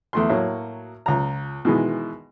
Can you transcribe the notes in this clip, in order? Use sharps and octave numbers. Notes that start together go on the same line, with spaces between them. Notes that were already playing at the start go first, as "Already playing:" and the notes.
E2 A3 C6
A2 F#3 A#3
C#2 A#5
B2 D#3 E3 G#3